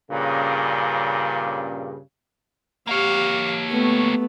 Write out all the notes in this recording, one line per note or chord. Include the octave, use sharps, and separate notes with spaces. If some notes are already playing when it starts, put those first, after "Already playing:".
G2 A#2 C#3
A#3 G4 C#5 F5
A3 B3